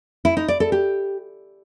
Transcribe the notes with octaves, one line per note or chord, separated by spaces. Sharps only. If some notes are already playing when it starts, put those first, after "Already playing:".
E4
D#4
D5
A4
G4